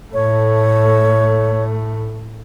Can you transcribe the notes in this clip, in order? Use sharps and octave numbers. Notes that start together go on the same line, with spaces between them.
A2 A3 C#5